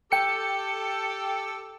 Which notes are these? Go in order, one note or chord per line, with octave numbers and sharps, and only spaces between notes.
G4 A4 G5 C#7